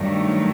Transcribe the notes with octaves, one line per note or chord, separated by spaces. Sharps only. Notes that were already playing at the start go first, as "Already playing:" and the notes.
Already playing: G2 D#3 F#3 A3